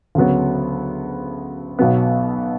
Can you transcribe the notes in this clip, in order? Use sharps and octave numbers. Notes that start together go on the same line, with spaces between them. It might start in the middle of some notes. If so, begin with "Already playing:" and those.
D2 C#3 F#3 B3
B1 B2 F#3 B3